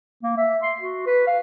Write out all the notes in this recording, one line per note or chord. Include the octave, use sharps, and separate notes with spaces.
A#3
E5
C6
F#4
B4
F5